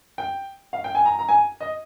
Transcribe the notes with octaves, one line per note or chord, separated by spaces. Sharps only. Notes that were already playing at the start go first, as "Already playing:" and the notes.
G5
F5
G5
G#5
A#5
A#5
G#5
D#5